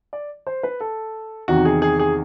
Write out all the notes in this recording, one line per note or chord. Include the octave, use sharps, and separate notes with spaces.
D5
C5
B4
A4
E2 C3 D#3 F#4
G#4
G#4
G#4